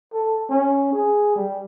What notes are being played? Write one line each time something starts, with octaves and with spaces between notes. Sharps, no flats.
A4
C#4
G#4
G3